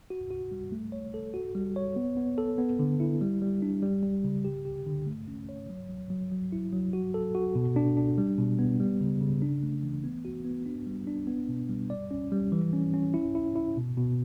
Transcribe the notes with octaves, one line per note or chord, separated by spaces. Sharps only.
F#4
F#4
G3
A3
C#5
A4
F#4
G3
C#5
B3
B3
A4
B3
D3
E4
G3
G3
D4
G3
G3
C#3
G4
G4
D3
A3
C#4
C#5
F#3
F#3
F#3
F#3
E4
F#3
F#4
A4
F#4
B2
D4
D4
G3
B2
B3
G3
C#3
C#3
D4
A3
E3
B3
F#4
B3
D4
G3
D4
B3
B2
G3
D5
C#4
G3
E3
C#4
C#4
E4
E4
E4
B2
B2